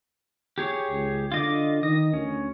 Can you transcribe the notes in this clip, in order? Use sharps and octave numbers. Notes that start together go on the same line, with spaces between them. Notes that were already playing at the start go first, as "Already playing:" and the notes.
G4 G#4 C#5
C#2
D3 F4 D#5 D6
D#3 D#5
D2 C#4